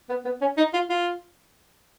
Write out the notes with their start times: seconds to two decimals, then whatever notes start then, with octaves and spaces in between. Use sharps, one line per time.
0.09 B3
0.25 B3
0.41 C#4
0.57 D#4
0.73 F4
0.89 F4